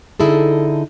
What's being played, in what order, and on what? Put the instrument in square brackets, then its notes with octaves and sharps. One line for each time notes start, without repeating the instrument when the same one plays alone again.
[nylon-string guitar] D3 D#4 E4 G#4 A4